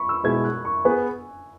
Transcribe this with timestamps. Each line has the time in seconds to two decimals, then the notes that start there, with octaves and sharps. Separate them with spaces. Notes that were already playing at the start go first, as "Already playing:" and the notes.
Already playing: B5 C#6
0.09 E6
0.24 B2 G#3 E4 B4 G#6
0.44 F#6
0.65 C#6
0.85 B3 G#4 B4 G#5